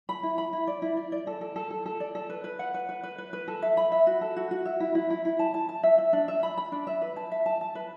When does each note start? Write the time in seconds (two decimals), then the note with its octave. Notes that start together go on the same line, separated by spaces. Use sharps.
0.09 B5
0.23 E4
0.38 B5
0.53 E4
0.67 D5
0.82 E4
0.97 D5
1.12 D5
1.27 A4
1.41 A4
1.56 A4
1.71 A4
1.86 A4
2.00 D5
2.15 A4
2.30 B4
2.44 B4
2.59 F#5
2.74 B4
2.89 B4
3.03 B4
3.18 B4
3.33 B4
3.48 A4
3.62 E5
3.77 B5
3.92 E5
4.07 F#4
4.21 A4
4.36 F#4
4.51 F#4
4.65 E5
4.80 E4
4.95 E4
5.10 E4
5.25 E4
5.39 A5
5.54 A5
5.69 A5
5.83 E5
5.98 E5
6.13 D4
6.28 E5
6.43 B5
6.57 B5
6.72 D4
6.87 E5
7.02 B4
7.16 A5
7.32 E5
7.46 A5
7.61 A5
7.75 B4